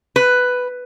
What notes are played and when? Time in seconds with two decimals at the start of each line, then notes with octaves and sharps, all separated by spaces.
0.16 B4